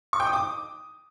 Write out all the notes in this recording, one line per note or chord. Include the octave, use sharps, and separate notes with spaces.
C#6
G5
D#6
D6